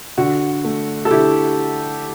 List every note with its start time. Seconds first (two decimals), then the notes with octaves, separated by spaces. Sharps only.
0.18 D3 F#4
0.64 A3
1.05 A4
1.11 D3 E4 G4